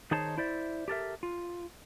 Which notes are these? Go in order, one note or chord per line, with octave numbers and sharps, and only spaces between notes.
D#3 D#4 G#4 C5 C#5 A5
E4 C5 D5 E5
G4 A4 A#4 E5
F4